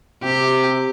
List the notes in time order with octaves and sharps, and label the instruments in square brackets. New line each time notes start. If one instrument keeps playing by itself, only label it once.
[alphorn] C3 [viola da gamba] G4